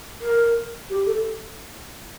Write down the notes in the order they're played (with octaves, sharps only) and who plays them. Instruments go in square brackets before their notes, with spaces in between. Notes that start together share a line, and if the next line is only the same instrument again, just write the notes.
[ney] A#4
G4
A4